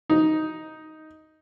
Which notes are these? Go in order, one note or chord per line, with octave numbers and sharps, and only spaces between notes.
D#4